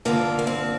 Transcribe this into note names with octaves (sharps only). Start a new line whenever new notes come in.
G2 D3 F3 A#3
A#3
C4